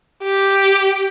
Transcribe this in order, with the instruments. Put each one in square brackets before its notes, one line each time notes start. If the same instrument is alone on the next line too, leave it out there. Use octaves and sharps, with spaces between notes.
[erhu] G4